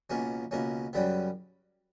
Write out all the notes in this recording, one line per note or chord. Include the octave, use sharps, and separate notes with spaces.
C#2 B2 A#3 C#4
C#2 B2 A#3 C#4
F#2 C#3 G3 B3